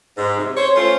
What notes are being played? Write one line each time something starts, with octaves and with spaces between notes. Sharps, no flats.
G#2
C3
C5 C#5
A3 C#4 F4 C5